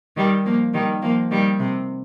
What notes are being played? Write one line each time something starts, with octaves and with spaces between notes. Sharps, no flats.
D#3 G3
F3 A#3
D#3 G3
F3 A#3
D#3 G3
C3